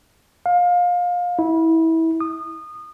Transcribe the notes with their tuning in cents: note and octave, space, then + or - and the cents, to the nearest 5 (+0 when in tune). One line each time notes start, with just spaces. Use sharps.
F5 +25
E4 -25
D#6 -25